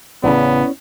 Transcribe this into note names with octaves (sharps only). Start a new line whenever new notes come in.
A1 C#3 B3 C#4 E4 D5